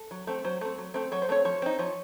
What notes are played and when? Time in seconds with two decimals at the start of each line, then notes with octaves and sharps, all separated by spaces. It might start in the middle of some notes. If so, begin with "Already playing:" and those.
Already playing: A4
0.11 F#3
0.27 A3 C4
0.45 F#3 C5
0.61 A3 C4
0.78 F#3
0.94 A3 C4
1.12 F#3 C#5
1.22 C5
1.29 A3 C4 C#5
1.45 F3 C#5
1.62 C4 D#4
1.79 F3 C#5